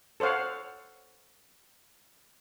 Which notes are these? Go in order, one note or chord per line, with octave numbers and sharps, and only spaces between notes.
A4 C5 C#5 F5 F#5